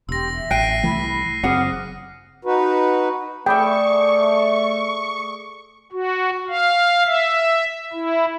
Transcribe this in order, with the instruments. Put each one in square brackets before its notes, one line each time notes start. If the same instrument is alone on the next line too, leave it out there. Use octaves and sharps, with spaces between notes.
[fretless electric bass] E1 [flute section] G4 C6 [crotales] E6 A#6
[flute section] E5
[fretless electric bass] A1 [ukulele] G5 [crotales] F#6 C7 D#7
[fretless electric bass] C2 E3 A3 [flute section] B5
[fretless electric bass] F#1 C4 [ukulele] G#4 F#5 [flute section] D6 D#6 F6
[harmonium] D#4 F#4 B4
[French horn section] A3 [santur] G#4 D5 E5 [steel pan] G5 B5 [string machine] C#6
[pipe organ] F#4
F5
E5
E4